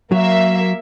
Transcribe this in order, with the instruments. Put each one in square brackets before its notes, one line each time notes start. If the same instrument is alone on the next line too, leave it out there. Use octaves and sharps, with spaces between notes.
[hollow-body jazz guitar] F#3 [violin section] A#3 E5